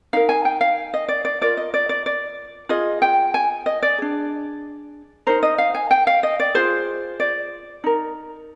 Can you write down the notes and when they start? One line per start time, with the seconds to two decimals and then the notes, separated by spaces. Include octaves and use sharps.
0.13 D#4 A#4 F5
0.29 G#5
0.45 G5
0.61 F5
0.94 D#5
1.08 D5
1.25 D5
1.41 F4 A#4 D5
1.57 D#5
1.74 D5
1.89 D5
2.06 D5
2.69 F4 G#4 D#5
3.02 G5
3.34 G#5
3.66 D#5
3.82 D5
3.98 D4 G#4
5.27 D#4 A#4 C5
5.43 D#5
5.58 F5
5.75 G#5
5.91 G5
6.07 F5
6.23 D#5
6.40 D5
6.54 F4 G#4 C5
7.20 D5
7.84 D#4 A#4